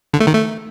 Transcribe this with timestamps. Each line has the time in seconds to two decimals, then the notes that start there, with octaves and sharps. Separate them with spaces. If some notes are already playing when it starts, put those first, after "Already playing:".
0.14 D3
0.20 A3
0.27 D#3
0.34 A3